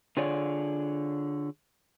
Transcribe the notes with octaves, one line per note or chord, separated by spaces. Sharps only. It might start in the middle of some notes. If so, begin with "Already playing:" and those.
D3 F4 G#4 C#5 D5